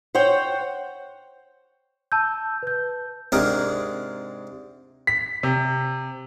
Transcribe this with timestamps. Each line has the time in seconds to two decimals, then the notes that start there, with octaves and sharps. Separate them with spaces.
0.15 C5 C#5 F#5 G5
2.12 A5 E6 G6
2.63 B4 G6
3.32 G#2 C3 D4 G#4 A#4
5.07 B6
5.43 C3